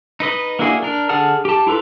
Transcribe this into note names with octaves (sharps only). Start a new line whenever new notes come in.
D#4 B4 D#5
A#3 D4 E4 F#4 G#4
D4 A#4
D3 G#4 F#5 A5 F6
G4 A5
E4 F4 A4 B4 A#5